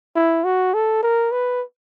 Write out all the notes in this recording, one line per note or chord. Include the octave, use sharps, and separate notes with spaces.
E4
F#4
A4
A#4
B4